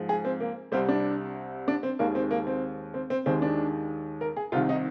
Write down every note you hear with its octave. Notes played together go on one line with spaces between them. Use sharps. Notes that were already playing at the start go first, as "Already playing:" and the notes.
Already playing: G#2 F3 G#3
G#4
C4
A#3
C2 C3 G3 C4
D4
D4
C4
D#2 D#3 G#3 A#3
C4
A#3
C4
C4
C4
D#2 D#3 G#3 C4
D4
A#4
G#4
C2 C3 D#3 F4
D#4